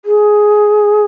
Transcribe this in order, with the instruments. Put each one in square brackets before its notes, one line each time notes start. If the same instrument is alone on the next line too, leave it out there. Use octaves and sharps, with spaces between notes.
[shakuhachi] G#4